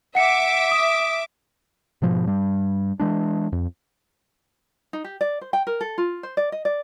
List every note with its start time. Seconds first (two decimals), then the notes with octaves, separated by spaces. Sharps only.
0.15 E5 F#5 D6 C#7
0.71 D#6
2.02 G#2 B2 F3
2.27 G2 G3
3.00 E3 G#3 D4
3.52 F2
4.93 D#4
5.04 G4
5.21 D5
5.41 C5
5.53 G5
5.67 A#4
5.81 A4
5.98 F4
6.23 C5
6.37 D5
6.52 D#5
6.65 D5